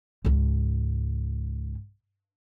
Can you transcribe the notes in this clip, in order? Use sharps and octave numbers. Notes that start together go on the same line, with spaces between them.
C#2 G#2